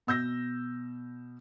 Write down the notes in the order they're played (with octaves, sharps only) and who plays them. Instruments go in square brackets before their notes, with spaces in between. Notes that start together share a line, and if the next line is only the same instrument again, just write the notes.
[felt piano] B2 E6 G6 A#6